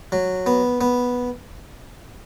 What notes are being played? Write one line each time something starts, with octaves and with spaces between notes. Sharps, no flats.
F#3
B3
B3